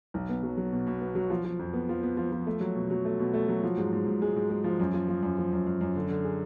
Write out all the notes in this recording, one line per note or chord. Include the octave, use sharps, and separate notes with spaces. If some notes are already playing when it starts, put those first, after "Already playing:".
B1
B3
F#3
F#3
B2
B2
B3
F#3
F3
F3
F2
B3
F3
B3
F3
F3
A3
F#3
B2
F#3
A3
B2
A3
F#3
F3
G#2
G#2
G#2
G#3
G#2
G#3
F3
F#2
F3
F3
F#2
F3
F#2
F#2
F#2
D3
D3
G#4